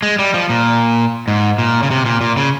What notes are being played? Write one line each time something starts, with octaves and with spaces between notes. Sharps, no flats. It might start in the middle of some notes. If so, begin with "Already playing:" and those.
G#3
G3
F3
A#2
G#2
A#2
C#3
C3
A#2
A#2
C#3